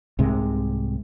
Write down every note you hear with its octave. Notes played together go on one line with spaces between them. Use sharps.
C2 G#2 C3 G#3